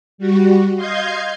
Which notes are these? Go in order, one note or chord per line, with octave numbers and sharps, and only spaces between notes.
G3 F#4
D#5 F5 C6 G6 G#6 C7